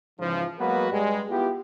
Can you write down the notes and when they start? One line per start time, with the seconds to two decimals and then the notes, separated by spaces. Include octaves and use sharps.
0.20 G#2 C#3 E3 F3
0.59 F#3 G#3 A#3 B3 F#4 B4
0.91 G2 G3 G#3
1.30 B3 E4 F4 G4